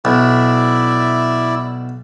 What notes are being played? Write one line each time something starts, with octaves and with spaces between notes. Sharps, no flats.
B1 E4 D5 E5